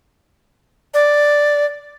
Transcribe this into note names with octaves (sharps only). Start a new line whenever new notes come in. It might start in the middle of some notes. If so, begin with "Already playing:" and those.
D5